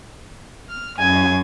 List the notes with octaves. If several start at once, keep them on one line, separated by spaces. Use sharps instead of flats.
F6
F#2 G#5